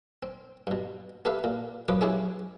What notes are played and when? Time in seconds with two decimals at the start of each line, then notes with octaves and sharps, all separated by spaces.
0.23 C4
0.67 G2 B2
1.25 B3 G4 A4 B4 E5 F5
1.44 A#2
1.88 F#2 F3 B4 D6 D#6
2.01 F#3 G#3 C#4 E4 G4 G#4